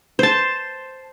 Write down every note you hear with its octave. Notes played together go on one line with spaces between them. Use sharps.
C5 A5